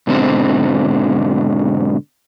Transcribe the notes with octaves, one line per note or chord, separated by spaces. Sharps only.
G#2 B2 D3 C4